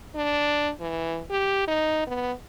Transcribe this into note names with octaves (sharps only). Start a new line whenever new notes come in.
D4
E3
G4
D#4
B3